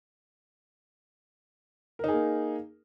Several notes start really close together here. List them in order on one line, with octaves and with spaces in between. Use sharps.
A#4 D#4 G#4 A#3